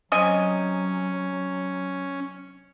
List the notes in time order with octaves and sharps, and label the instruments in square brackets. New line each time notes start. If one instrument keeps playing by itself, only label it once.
[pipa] C3 D#5 G#5 [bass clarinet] F#3 [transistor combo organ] C#4